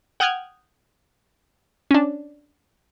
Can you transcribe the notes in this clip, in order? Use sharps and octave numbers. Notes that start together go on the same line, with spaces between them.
F#5 G5 D#6 F6 F#6 G#6
C#4 D4